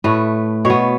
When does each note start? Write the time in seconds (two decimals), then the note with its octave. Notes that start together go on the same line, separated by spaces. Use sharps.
0.04 A2 A3 B4
0.65 B2 C#5
0.70 B3